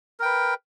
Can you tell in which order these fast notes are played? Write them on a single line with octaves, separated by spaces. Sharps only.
A#4 G5 B4